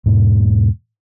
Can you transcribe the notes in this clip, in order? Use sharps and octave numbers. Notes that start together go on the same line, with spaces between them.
E2 G#2 B2